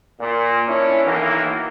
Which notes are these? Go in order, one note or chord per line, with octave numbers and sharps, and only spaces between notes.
A#2
C#4 D4 E4
B1 D#3 E3 A#3